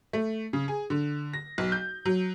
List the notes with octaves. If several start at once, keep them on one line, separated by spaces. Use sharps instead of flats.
A3
C#3
G#4
D3
A#6
B1
G6
F#3